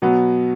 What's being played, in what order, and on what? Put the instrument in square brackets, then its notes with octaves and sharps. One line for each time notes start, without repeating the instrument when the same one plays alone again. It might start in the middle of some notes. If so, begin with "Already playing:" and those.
[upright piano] B2 F#3 B3